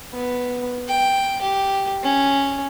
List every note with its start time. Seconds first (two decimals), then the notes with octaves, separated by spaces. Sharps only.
0.13 B3
0.88 G5
1.42 G4
2.03 C#4